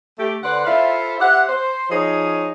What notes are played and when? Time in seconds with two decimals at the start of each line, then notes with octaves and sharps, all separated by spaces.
0.18 A3 G4
0.43 D3 B4 C5 D5 F#5
0.66 E4 F4 A4 C5 E5 F5
1.20 G4 C5 E5 F#5
1.49 C5
1.90 F3 D#4 G#4 C#5 D#5